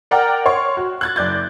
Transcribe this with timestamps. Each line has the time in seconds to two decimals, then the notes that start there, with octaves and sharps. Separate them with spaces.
0.11 A#4 D5 F#5 G5 A#5 F6
0.46 C#5 C6 C#6
0.77 F#4
1.01 F#6 G#6 A6
1.16 F#1 D5 G6 A6